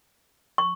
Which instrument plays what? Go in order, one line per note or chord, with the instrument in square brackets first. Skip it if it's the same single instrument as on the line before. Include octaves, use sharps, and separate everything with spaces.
[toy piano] C#6